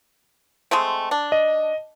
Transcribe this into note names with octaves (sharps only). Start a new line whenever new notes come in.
G#3 A3 C4
D4
D#5